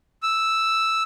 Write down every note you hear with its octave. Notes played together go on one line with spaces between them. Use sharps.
E6